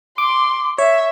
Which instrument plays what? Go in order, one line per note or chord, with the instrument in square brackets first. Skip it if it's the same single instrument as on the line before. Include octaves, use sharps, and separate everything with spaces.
[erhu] C6 [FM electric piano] D6
[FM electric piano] C#5 [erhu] E5